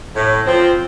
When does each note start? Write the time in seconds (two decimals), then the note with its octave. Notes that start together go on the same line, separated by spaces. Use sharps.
0.15 A2
0.46 F3 C4